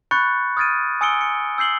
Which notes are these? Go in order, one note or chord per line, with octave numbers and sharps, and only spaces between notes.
B5 C#6 F#6 G6 A6 C#7
D#6 F6 G#6 A6 D7 D#7
G#5 D#6 E6 C#7 D7 G7
C#7
E6 G6 C7 F#7 G7